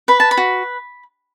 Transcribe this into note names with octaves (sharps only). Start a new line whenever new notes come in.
B4 B5
A5
B5
F#4